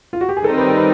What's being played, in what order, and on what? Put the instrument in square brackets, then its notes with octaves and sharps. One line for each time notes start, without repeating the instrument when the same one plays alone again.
[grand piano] F4
F#4
G4
G#4
[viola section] D#3 G3 C4 D#4 [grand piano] A4
[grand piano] B4
A#4
B4